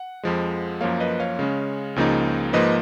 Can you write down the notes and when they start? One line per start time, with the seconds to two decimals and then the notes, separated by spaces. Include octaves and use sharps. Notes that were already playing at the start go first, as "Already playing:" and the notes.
Already playing: F#5
0.23 F2 F3 G#3
0.81 F#2 F3 A#3 C#5 F5
1.00 B4 D#5
1.20 C#5 F5
1.39 C#3 G#3 C#4
1.96 C#2 C#3 F3 A#3 D#4
2.53 G#2 F3 A#3 B4 D#5